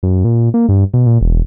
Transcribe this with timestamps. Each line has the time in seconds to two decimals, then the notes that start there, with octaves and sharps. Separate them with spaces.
0.03 F#2
0.24 A#2
0.54 A#3
0.69 G2
0.94 B2
1.06 A#2
1.21 E1